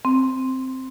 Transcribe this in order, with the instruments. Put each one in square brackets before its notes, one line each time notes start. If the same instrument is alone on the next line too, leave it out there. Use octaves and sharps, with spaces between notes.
[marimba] C4